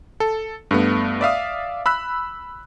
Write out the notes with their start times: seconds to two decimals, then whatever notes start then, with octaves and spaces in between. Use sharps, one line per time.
0.20 A4
0.71 G2 A3 B3
1.21 D5 E5 F5 D#6
1.86 B5 E6 F#6 B6